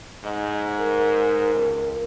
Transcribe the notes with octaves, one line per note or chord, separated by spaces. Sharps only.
G#2 D#5
A#4
C#2